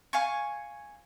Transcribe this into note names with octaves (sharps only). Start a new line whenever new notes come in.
F5 G#5 C#6